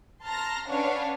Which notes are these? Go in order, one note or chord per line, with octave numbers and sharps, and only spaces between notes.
A5 A#5 C6 F6 A#6
C#4 D4 B4 C#5 F5 F#5